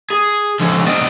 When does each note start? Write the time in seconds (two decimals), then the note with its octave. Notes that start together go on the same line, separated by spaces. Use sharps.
0.10 G#4
0.60 D3 F3 G#3 C#4
0.85 B3 C4 D4 D5 D#5